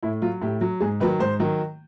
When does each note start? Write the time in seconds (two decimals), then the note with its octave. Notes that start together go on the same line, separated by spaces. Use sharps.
0.03 A2 E4
0.22 F#3 F4
0.42 A2 G4
0.61 F#3
0.80 G#2 G#4
1.00 D#3 F#3 B4
1.20 G#2 C5
1.40 D#3 F#3